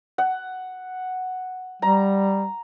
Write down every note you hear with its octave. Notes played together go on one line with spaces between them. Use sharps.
F#5
G3 A#5